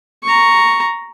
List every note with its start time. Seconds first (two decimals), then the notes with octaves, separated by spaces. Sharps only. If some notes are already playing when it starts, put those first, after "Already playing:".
0.23 A#5 C#6